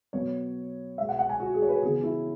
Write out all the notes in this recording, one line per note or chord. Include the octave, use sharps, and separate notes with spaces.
B2 F#3 B3 C#5
B2 G#3 B3 E5
F#5
F#5
G#5
F#4
G#4
C#5
B4
C#3 E3 B3 G#4
E4